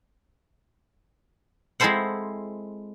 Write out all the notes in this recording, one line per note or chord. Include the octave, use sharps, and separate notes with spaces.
G#3 C4 E4 A4 C5 F#5